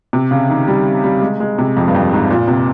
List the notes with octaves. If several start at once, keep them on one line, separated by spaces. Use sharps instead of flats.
C3
C#3
D#3
G3
G3
G#3
G#3
C3
F2
G2
F2
G#2
A#2
C3